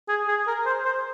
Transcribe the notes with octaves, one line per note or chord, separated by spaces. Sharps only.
G#4
G#4
A#4
C5
C5